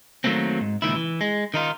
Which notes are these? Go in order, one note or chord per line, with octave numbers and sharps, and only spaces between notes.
D#3 F3 F#3 A3 A#3 C4
G#2
C#2 A#2 D#3 E4
E3
G#3
D#3 D#4 F4